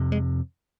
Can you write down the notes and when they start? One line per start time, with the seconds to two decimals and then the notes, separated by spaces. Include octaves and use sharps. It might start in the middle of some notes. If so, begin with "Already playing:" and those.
Already playing: F2 C3
0.12 G#3